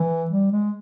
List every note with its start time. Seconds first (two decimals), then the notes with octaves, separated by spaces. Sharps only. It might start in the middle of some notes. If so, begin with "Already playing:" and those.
Already playing: E3
0.30 G3
0.52 G#3